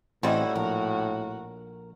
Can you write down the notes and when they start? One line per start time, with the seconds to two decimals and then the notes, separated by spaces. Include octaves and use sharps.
0.23 A1 A2 G3 C4 D#4 E4 F#4
0.55 A#1 A#4